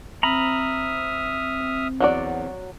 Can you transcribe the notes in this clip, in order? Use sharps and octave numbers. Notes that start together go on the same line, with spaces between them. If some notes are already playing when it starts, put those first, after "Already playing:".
C4 E5 A#5 B5 D#6 F6
E2 F#3 F#4 D5